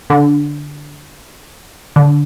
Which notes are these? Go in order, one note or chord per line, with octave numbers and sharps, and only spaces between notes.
D3
D3